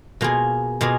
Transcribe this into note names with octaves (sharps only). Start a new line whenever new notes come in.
B2 A#3 F4 G#4
B2 A#3 F4 G#4